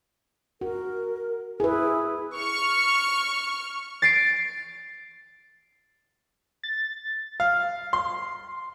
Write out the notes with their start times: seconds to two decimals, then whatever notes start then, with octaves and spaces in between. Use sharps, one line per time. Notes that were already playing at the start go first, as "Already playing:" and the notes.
0.61 F#4 A#4
1.60 E4 G#4 B4
2.37 C#6 F6
4.02 A6 C7 D7
6.63 A6
7.40 F5
7.93 C6